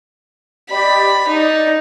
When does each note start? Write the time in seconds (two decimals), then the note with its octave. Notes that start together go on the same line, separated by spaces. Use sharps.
0.69 G4 D5 D#5 B5
1.28 D#4 D5